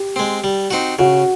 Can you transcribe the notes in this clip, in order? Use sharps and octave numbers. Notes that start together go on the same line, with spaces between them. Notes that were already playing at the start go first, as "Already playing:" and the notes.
Already playing: G4
G#3 C4
G3
C4 D#4 F#4
C#3 F#4